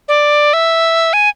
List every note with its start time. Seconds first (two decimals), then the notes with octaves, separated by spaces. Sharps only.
0.08 D5
0.53 E5
1.13 G#5